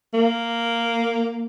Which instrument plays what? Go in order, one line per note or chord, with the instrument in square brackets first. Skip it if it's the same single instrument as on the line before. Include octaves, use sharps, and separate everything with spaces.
[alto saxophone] A#3